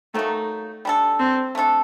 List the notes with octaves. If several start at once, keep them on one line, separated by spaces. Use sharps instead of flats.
D#3 F#3 A3 A#3 D#4
G3 D4 A4
C4
A3 D4 A4